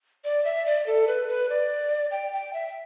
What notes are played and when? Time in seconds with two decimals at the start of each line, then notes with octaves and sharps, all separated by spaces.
0.25 D5
0.45 E5
0.66 D5
0.87 A4
1.07 B4
1.28 B4
1.50 D5
2.11 G5
2.32 G5
2.54 E5